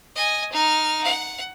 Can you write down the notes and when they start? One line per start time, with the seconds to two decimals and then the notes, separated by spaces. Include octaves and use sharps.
0.15 D#5 G#5
0.52 D#4 F6
1.04 F#5